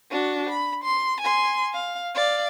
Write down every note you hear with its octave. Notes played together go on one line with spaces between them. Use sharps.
D4 F#4
B5
C6
G#5 C6
F5
D5 F5